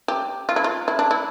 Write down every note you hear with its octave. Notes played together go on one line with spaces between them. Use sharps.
G4
F4
E4
F4
E4
D4
E4